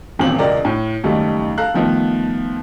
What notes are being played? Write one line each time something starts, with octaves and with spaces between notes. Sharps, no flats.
D#1 G#1 E2 A#2 C4 F#7
E1 C#2 A#4 D5 D#5 G5
A2
F#1 D#2 G3 A3 D#4 A5
A4 F5 A#5 F#6
D#3 F3 A3 B3